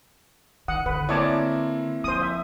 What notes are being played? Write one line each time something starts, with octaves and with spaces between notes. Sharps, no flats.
D#3 F#5 D#6
D3 B4
A#3 C4 E4 C#5 D5 A5
F3 C5 D#6
E5